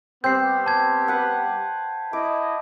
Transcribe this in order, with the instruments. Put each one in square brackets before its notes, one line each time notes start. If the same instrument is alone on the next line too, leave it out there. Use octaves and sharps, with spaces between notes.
[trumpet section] G3 B3 G4 [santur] C4 [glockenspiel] G6 C7
[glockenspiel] A5 G#6
[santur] B4 F#5
[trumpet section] E4 D#5 [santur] D6